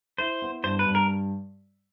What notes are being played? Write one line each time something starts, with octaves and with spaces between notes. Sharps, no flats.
E4 C5
B3
G2 C5
B4
G2
A#4